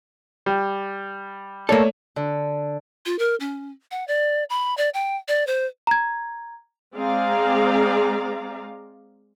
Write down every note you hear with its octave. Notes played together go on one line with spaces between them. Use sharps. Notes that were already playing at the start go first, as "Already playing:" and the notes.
G3
A3 A#3 A4 C#5 D5
D3
F4
A#4
C#4
F#5
D5
B5
D5
G5
D5
C5
A#5 G#6
G#3 C4 G#4 D5 F5 A#5